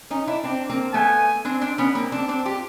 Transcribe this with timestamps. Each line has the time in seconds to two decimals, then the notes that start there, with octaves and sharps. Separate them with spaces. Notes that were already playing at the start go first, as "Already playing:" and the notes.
0.10 C#4 D#4
0.27 D4 E4
0.44 C4 D4
0.70 A#3 C4
0.94 A3 B3 G#5
1.45 C4 D4
1.61 C4 D4
1.78 B3 C#4
1.95 A#3 C4
2.12 C4 D4
2.29 C4 D4
2.45 F4 G4